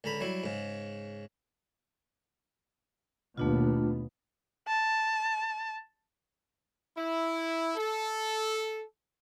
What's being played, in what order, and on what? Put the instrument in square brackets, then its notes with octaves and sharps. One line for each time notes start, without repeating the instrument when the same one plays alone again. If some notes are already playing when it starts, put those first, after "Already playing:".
[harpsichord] C#2 D3 A#5 B5
F#3 G3 E4
G#2 C#3
[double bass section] D#2 B2 B3 [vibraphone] A3 D4 F4
[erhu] A5
[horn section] E4
A4